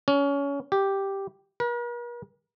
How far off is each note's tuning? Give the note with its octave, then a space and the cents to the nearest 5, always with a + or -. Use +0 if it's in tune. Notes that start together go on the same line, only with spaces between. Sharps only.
C#4 +25
G4 +0
A#4 +45